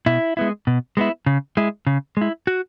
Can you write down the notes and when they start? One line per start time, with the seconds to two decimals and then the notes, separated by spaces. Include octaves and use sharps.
0.06 B2 E4
0.37 G#3 B3 E4
0.67 B2
0.97 G#3 B3 E4
1.26 C#3
1.57 G#3 E4
1.87 C#3
2.17 G#3 E4
2.47 F#4